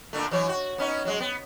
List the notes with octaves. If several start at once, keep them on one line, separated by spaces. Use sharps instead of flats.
A#2 D3 A3
E3 F#3 C#5
F#4
B3 C#4 D#4
F#3 G#3
B3